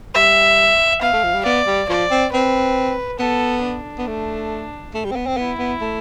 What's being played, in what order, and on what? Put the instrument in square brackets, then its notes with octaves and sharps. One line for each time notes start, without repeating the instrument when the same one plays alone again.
[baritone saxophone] G3 [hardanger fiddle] E5
[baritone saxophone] B3 [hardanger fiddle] F5
[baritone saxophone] A3
F3
G3
[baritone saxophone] B3 [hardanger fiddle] D5
[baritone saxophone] G3
[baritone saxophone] F3 [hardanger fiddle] D5
[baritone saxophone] C4
[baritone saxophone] C4 [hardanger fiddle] B4
[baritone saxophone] B3 [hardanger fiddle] A4
[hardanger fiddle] D4
[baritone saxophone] B3
A3
A3
G3
C4
B3
C4
[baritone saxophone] B3 [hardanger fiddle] E4
[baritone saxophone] B3
A3